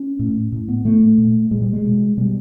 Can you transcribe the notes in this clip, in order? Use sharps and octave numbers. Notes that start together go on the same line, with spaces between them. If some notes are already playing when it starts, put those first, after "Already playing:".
Already playing: C#4
A2
A2
B3
A2 A3
A#2
A#2 G#3
G3
G#3
B2
B2 G3